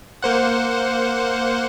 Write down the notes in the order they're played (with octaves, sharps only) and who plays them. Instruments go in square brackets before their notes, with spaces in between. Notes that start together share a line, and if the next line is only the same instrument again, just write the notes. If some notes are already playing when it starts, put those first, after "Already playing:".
[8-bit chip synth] A#3 C5 F#5